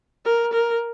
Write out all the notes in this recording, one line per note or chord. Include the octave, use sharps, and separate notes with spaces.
A#4
A#4